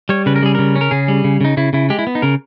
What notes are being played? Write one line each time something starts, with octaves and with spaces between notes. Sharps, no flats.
G3 C#5
C#3 B4
A#4
G3 G#4
C#3 A#4
C#4
A#4
C#3 G#4
G3
C#3
C#3 D#4
C#3 E4
C#3 E4
G#3 G4
E4
B3
D#4
C#3 A#4